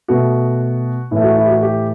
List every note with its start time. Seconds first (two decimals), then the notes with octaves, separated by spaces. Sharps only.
0.08 B2 A3 F#4
1.11 A2 E3 A3
1.24 F#4
1.37 E4
1.46 G4
1.50 F#4
1.62 G4